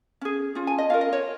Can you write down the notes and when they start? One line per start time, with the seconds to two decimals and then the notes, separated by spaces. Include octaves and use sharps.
0.21 C#4 G#4
0.55 C#4 F4
0.67 G#5
0.78 D#5
0.90 C#4 F4 A#4 F5
1.01 D#5
1.13 C#5